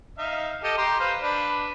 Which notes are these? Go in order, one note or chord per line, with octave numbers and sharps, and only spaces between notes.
D#4 E5 F5
G4 A4 D#5
G4 A#5 C6
B4 C5 F5
D4 B4 B5